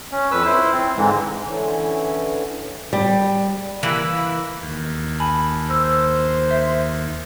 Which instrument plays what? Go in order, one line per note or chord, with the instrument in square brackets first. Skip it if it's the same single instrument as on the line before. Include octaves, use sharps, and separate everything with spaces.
[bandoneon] C#4
F2 B4 E6
E4 C5
C4
G#2 D3 E3 G#3
[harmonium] D3 E3 C#4
[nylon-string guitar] G3
[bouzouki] E3 A#3 E4 B4
[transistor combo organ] D#2
[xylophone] G#5 A5 B5
[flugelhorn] C5 [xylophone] E6
[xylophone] E5